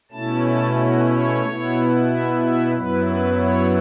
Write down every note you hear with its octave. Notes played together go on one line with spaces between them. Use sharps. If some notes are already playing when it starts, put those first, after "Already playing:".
B2 A3 C#4 E4 A5
A5
F#4
C#5
B2 B3 E4
E5
E5
F#2 F#3 B3 E4 B4
B4
C#5